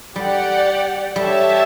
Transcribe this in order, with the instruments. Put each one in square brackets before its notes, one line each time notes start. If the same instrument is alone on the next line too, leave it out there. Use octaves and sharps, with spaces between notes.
[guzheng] G3 [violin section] G4 D5 F#5
[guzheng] G3 [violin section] G4 C#5 E5 A5